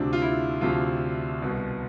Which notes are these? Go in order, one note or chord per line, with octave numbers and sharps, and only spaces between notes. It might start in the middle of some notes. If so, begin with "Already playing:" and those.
Already playing: D2 C3 F3 D4
F4
E4
D2 C3 F3 F4
C2 B2